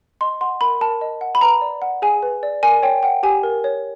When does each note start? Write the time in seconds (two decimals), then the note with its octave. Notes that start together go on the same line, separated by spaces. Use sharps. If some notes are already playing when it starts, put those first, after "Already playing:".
0.21 D#5 C6
0.41 F#5 C6
0.61 A#4 B5
0.81 A#4 A5
1.01 D#5
1.21 F#5
1.35 B5
1.41 B4 A#5
1.61 D5
1.82 F#5
2.02 G#4 G#5
2.23 B4
2.43 D5
2.63 A#4 G#5
2.83 C#5 G5
3.03 F#5 G5
3.23 G4 G#5
3.43 A#4
3.64 C#5